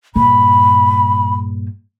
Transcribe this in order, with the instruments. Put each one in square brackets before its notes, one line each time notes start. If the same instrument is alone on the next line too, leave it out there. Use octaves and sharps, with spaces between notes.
[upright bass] G2 A#2 [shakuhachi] B5